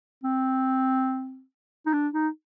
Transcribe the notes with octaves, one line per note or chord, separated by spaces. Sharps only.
C4
D#4
D4
D#4